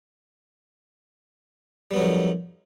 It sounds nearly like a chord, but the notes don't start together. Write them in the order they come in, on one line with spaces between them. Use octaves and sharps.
G3 B3 F#3 F2 D#3